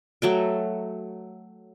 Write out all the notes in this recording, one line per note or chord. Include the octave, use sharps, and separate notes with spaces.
F#3 A3 G5